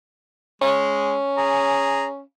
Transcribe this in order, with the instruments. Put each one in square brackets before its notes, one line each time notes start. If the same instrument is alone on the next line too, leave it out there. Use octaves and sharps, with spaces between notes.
[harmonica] G#3 [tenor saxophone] C#4
[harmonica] G#4 A#5